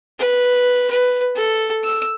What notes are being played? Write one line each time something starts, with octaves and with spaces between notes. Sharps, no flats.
B4
B4
A4
E6